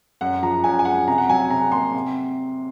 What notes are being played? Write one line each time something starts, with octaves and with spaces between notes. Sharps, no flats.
F#2 F#5
F3 A#5
F#2 G#5
G#5
G#3 F#5
C3 A#5
F#5
F#3 G#5
C3 A#5
A#3 C6
C3